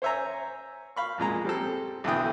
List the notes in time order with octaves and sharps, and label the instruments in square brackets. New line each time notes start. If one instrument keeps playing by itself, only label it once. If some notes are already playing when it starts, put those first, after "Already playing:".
[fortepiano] C5 C#5 E5 G#5 A#5
F5 B5 C#6
F2 A#2 G#3 A#5
G3 C4 A4
B1 E2 D3 E3 G5 D#6